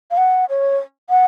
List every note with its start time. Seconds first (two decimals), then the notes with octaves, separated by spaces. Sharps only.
0.11 F5
0.17 F#5
0.49 C#5
1.10 F#5